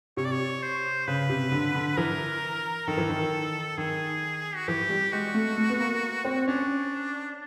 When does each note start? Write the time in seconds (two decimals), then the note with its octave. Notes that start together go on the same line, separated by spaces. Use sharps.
0.17 C3 C#5
0.25 D5
0.32 C#5
0.62 C5
1.07 C#3 B4
1.29 C3
1.52 D3
1.75 D3
1.97 E3 A#4
2.87 D#3 A4
2.98 E3
3.09 D#3
3.77 D#3 G#4
4.56 F#4
4.67 E3 G4
4.89 G3
5.12 G#3 F#4
5.34 A3
5.58 A3
5.70 B3
5.80 A#3
6.25 C4
6.48 C#4 D4